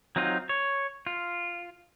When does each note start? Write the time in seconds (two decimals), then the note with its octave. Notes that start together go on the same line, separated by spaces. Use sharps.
0.16 F#3 C4 D#4 F4
0.49 C#5
1.07 F4